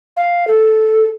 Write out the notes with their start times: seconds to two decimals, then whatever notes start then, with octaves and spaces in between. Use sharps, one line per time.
0.17 F5
0.47 A4